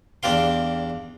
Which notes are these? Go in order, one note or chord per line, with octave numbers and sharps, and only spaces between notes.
E2 D4 G4 F5 C6